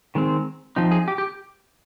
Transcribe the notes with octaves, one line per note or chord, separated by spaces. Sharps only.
D#3 G#3 C4
F3 C4 D#4
G#4
G4
G4